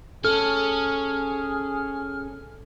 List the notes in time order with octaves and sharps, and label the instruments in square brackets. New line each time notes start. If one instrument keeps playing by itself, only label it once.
[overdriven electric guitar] C#4 [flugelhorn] G#4 [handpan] A4 [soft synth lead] F6